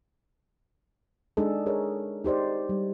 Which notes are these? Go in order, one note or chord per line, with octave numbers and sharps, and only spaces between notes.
G#3 D4 D#4 G#4 A4
G#4 A#4 C#5
D#4 G4 C5 D5
G3